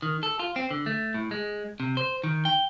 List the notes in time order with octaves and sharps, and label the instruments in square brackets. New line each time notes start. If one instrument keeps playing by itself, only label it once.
[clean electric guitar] D#3
A4
F4
C4
D3
A3
A2
G#3
C3
C5
D#3
G5